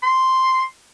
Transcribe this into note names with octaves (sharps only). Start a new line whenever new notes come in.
C6